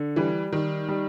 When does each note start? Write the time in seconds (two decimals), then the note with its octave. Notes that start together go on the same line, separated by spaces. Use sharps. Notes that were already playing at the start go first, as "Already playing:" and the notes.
Already playing: D3
0.16 E3 G3
0.53 D#3 G3
0.89 G3